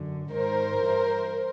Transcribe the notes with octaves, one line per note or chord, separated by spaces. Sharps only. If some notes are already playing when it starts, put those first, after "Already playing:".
Already playing: F#2 D3
G#2 D#3 A#4 C5
G2 E3